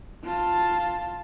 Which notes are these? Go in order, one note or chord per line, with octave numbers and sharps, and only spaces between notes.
F4 A5